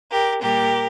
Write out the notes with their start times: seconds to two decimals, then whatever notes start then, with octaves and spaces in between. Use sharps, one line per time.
0.11 G4 A#4
0.41 A#2 G3 A#3 G4 A#4